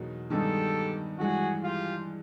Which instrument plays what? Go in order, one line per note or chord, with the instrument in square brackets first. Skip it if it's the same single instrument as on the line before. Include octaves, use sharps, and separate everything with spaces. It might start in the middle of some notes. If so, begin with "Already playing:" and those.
Already playing: [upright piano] E2 B2 F#3 A#3 D#4
[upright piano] G2 D#3 G#3 B3 D#4 [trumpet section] G4 A4
[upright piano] G2 E3 G#3 [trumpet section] F#4 G#4
[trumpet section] F4 G4